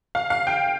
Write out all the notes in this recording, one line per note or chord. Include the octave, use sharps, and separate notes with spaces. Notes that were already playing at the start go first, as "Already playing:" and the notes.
F5
F5
G5